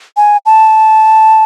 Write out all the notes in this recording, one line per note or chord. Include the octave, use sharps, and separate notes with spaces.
G#5
A5